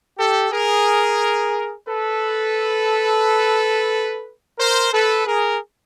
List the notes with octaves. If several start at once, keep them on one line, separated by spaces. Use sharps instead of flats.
G4 A4
G#4 A#4
A4 B4
A#4 C5
A4 B4
G#4 A#4